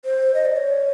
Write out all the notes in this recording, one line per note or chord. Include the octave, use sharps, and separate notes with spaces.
C5
D#5
D5
C#5